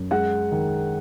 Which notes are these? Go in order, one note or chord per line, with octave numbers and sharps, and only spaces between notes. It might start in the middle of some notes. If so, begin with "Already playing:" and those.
Already playing: F#2
G#3 F#5
D#3